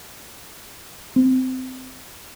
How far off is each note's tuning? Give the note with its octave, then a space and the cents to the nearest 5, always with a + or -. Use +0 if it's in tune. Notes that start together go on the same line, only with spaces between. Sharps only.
C4 -20